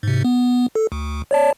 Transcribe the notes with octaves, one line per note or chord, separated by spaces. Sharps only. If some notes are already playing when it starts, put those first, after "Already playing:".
G#2 C3
B3
A4
D2
C#5 D5 A5